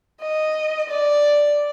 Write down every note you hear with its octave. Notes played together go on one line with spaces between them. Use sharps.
D#5
D5